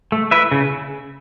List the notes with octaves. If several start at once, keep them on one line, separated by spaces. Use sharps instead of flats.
A3
E4 B4 E5
C#3